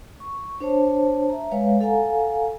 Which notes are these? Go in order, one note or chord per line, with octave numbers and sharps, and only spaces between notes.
C#6
D4 C5 C#5 A5
E5 A#5
G#3 B4 C#5 F5
A4 F5 F#5 G#5 A#5